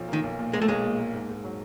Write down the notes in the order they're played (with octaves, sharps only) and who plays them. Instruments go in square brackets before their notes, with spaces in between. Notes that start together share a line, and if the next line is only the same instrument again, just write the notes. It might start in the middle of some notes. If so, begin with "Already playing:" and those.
Already playing: [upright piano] B1 F3
[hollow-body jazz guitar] D#3 [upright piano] A#3
[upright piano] B1
A#2
[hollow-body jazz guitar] G#3 [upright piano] A#3
[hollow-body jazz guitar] A3
[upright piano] B1 [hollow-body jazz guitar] G#3
[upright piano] A#2
A#3
G#2
G#2
F#3